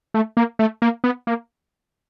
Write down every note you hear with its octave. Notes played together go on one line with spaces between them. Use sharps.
A3
A#3
A3
A#3
B3
A#3